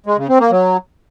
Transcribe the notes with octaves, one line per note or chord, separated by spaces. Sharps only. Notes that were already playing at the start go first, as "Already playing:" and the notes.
G#3
C#3
C4
A#3
F#3